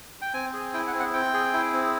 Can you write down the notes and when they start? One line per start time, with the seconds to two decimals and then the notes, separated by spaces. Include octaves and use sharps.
0.22 G5
0.34 C4 G#5
0.53 G#4
0.74 E4 G5
0.87 F#5
0.93 C4
1.00 F#5
1.13 C4 G5
1.34 G#4
1.53 E4
1.73 C4